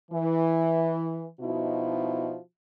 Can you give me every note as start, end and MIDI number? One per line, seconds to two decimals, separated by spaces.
0.12 1.27 52
1.40 2.36 47
1.40 2.36 53
1.40 2.36 63
1.40 2.36 64
1.40 2.36 66